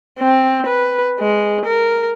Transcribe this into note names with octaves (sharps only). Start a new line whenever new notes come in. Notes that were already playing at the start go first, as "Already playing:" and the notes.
C4
B4
G#3
A#4